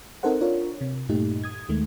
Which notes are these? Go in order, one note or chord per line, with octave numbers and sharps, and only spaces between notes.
C4 D#4 A4 A#4 C5 F#5
D4 F4 A#4 C#5
C3
G2 A#2 A3 D#4 G4
D#6 G#6
D#2 D#3 G#3 A3